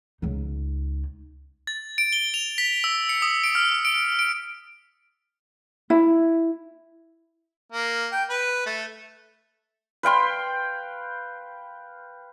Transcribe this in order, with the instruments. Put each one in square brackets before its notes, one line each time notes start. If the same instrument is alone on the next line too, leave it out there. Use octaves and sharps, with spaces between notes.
[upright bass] C#2 D#4
[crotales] A6
D7
G7
F7
B6
E6
C#7
D#6
D7
F6
D7
D7
[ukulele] E4
[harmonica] A#3
G5
B4
A3
[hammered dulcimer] B4 F5 G5 C6